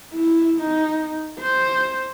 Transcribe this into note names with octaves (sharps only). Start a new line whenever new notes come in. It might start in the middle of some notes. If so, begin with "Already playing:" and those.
E4
D#4
C5